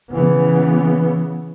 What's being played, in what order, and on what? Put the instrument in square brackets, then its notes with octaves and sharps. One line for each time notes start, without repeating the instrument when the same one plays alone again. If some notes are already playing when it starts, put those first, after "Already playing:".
[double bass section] C#3 E3 B3